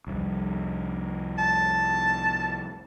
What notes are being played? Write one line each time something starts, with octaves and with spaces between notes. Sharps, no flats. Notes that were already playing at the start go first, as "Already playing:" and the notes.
C2 F2
A5